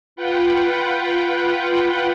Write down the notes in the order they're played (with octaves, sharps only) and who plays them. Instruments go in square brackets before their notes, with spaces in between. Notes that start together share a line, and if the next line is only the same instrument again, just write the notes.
[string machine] F4 B4 F#5 G5